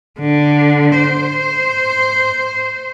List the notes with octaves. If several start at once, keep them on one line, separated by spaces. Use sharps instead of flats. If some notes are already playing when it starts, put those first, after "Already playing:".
D3
C5